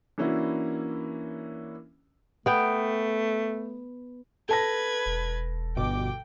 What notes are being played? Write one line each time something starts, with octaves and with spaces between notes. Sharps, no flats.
E3 A#3 C#4 D4 E4 F#4
A3 B3 G5
A4 B4 A5 G#6 A#6
E1
G1 B2 G5 D6